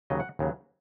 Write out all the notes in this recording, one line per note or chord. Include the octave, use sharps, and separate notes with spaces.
D#2 C#3 F#3 D#5
F#5
D#2 C#3 F#3